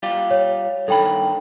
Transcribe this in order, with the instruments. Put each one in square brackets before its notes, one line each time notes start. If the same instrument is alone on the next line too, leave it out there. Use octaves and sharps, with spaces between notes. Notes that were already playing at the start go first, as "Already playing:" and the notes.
[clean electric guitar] G3 F4 G4
[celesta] C#5
[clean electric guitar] G2 D#3 B5 [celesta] A4 G5